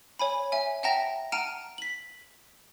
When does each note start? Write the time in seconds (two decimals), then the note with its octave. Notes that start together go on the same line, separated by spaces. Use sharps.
0.19 C#5 G#5 B5
0.52 E5 G#5
0.83 E5 F#5 G5 A5 A#5 A#6
1.32 F#5 A5 A#5 F6 D7 D#7
1.78 B6 F#7